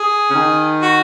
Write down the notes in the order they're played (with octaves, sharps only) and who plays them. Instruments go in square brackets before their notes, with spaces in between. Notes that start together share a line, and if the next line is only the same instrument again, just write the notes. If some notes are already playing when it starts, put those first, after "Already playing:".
Already playing: [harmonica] G#4
[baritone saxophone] C#3
D#3
[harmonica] F#4